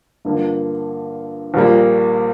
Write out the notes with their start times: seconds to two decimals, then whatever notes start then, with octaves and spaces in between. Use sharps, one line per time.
0.25 G2 D3 F3 A#3
1.54 A#1 A#2 G3 A#3